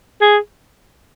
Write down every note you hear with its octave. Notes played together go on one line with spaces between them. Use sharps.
G#4